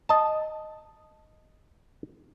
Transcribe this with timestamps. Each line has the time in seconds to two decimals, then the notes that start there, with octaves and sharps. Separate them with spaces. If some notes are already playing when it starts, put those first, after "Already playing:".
0.09 D#5 A5